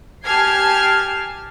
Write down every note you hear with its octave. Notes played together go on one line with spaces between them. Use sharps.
G4 G#5 A5 F6 G#6 C7